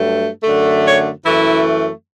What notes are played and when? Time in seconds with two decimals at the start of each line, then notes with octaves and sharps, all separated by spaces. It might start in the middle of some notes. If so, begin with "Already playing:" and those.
Already playing: G2 F#3 A3
0.43 F#2 D3 A3
0.85 C#5
1.24 F#2 E3 A3 E4